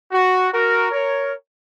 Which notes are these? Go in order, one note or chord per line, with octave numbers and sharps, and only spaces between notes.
F#4
F#4 A#4
A#4 C#5